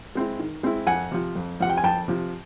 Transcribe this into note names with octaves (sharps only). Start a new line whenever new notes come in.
G#3 C4 E4
D#3
G#3 C4 E4
F2 F#5 G#5
C3 F3
F2
C3 F3 F#5
G5
G#5
F2 G5 A5
C3 F3